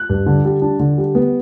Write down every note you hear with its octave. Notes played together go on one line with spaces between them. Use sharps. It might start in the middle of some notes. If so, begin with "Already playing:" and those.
Already playing: F#6
G2
D3
G3
D4
D3
G3
B3